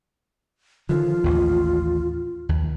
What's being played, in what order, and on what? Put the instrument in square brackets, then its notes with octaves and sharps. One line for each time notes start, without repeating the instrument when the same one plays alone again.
[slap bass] D3 D#3 F3 [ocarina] F4
[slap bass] A1 D#2
D#2